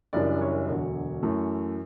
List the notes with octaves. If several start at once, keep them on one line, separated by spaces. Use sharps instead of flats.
F#1 F#2 E3 G3 D4 D5
C#5
E1 D2 D3 F#3
F#2 E3 A3